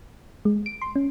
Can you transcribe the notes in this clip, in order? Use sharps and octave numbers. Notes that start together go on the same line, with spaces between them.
G#3
D7
C6
C#4